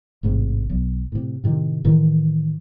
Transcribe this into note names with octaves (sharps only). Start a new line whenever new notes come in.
A1 G#2 C3
B1
A2 C3
A2 C3 D#3
A2 D#3 E3